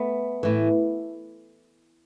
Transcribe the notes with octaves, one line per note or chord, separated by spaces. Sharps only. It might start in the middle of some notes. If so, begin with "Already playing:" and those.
Already playing: A3 B3
A2 E3